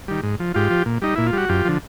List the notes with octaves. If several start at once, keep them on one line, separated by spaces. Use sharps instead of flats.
D#3 G3
G#2
F3
G#2 F4 G4
F3
A#2
G3 D#4
A#2 E4
F4
G3 F#4
F#2 F4 G4
D3 F3